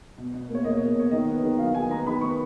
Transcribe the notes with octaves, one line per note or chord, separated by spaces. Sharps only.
B2
B2
A#3
C#5
A#3 D#5
B2 C#5
B2 C#5
D#3 D#5
B3
D#3
F#3 F5
D#3 G#5
B3 A#5
D#3 B5
B3 C#6